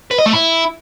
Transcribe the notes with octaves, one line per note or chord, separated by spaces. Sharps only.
B4
D#5
A3
E4